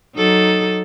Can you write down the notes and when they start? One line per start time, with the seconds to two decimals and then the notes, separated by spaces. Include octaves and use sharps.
0.15 F#3 D#4 A4